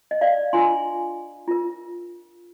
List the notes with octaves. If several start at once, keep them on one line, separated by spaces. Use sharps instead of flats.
D#5
D5 F5
D4 F4 A#4 G#5 C6
F4 A#4